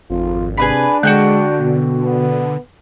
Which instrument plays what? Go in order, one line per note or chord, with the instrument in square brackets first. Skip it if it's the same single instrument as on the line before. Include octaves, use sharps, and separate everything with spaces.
[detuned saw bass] G#1 [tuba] F2 [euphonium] F4
[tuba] C3 [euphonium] D4 [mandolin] G#4 B4 B5
[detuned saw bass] D3 [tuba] G#3 [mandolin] F#4 G5 F#6
[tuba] B2
[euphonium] B3